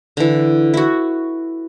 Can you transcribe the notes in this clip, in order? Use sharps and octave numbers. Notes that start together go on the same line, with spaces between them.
D3 E3
E4 F#4